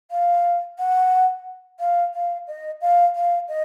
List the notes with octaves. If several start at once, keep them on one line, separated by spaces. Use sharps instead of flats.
F5
F#5
F5
F5
D#5
F5
F5
D#5